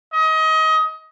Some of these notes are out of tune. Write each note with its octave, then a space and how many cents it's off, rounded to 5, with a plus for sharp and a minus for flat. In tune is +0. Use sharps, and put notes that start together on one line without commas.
D#5 +25